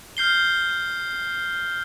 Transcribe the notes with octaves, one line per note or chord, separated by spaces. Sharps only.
F6 G6 C7 G7